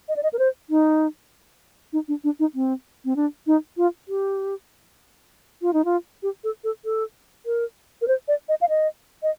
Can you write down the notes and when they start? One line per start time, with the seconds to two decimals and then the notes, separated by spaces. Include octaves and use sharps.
0.08 D#5
0.16 D5
0.23 D#5
0.33 A#4
0.39 C5
0.70 D#4
1.93 D#4
2.08 D4
2.24 D4
2.40 D#4
2.55 C4
3.05 C4
3.16 D4
3.47 D#4
3.77 F4
4.08 G4
5.62 F4
5.73 D#4
5.85 F4
6.23 G4
6.44 A4
6.64 A4
6.85 A4
7.46 A#4
8.02 A#4
8.08 C5
8.28 D5
8.49 D#5
8.61 F5
8.69 D#5
9.23 D#5